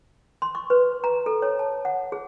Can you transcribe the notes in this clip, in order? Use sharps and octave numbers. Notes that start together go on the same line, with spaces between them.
C6
C#6
B4
A#5
A4
C#5
A5
F#5
G#4